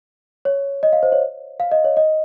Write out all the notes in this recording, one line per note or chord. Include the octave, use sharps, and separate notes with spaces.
C#5
D#5
F5
C5
C#5
F5
D#5
C#5
D#5